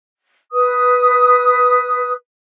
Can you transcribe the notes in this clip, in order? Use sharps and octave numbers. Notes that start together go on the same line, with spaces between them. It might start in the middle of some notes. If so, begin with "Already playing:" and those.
B4 D#6